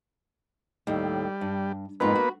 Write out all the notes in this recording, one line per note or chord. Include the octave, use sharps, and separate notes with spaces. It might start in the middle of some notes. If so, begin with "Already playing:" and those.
D#2 A2 G3
G2
F2 G#2 A#3 B3 F4 B4
F#4